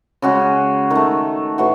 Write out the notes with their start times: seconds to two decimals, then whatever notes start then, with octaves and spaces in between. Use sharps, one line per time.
0.22 C#3 G#3 F#4
0.90 D#3 A3
1.58 A2 E3 F#4